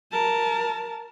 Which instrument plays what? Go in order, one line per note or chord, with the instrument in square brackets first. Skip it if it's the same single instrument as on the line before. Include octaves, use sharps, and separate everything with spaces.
[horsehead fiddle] A#4 A5